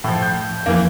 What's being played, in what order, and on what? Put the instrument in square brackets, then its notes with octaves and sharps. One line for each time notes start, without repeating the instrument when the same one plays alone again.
[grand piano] A2 F3
G6
[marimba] F2 F3 [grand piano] E3 A#3